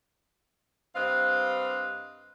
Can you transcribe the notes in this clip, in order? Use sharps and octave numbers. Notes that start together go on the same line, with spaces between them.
G2 C4 B4 D#5 F5